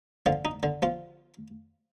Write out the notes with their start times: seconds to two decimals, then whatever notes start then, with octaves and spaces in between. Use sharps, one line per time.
0.26 D3 F3 F4
0.45 D#4
0.63 D3
0.82 F3 F4